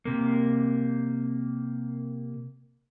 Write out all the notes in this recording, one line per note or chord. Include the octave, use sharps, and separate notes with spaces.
C3 A#3